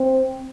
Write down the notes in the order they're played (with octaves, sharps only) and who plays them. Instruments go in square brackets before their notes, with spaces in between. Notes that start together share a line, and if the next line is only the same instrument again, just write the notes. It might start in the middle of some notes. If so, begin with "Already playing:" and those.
Already playing: [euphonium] C4